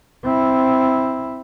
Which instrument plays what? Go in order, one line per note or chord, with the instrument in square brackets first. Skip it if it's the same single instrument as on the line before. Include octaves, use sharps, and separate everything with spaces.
[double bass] C4 E4